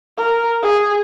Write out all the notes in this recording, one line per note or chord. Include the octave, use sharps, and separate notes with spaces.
A#4
G#4